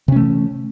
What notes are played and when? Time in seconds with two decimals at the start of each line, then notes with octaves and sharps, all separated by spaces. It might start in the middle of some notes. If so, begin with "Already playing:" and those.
0.08 C3
0.12 C#4
0.16 A3
0.20 E3